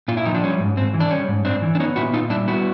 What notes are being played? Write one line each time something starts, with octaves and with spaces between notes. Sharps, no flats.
A#2 F4
E4
F3 D#4
D4
G3 C#4
G#2
G#2 C4
E3
D4
G3 C#4
G#2
G#2 C4 D4
E3
D4
B3 C#4 D#4
A#2 E4 F#4
A#2 D#4 F4
G3 D4 E4
B3 E4 F#4